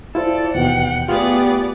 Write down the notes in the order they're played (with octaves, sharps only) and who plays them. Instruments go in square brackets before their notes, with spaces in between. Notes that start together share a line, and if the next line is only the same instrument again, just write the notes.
[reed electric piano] E4 F4 C5 [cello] A4 D5
[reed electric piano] D#2 B2 E3 [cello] F#5 G5
[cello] A3 G#4 [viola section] B3 D5 [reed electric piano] F4 [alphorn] G4